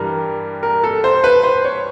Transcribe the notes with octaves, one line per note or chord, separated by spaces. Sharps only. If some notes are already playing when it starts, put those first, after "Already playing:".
Already playing: G2 E3 G3 A#4
A#4
A4
C5
B4
C5
C#5